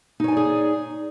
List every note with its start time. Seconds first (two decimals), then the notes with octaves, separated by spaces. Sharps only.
0.20 D#4
0.24 C#5
0.28 G#5
0.32 D5
0.37 G#4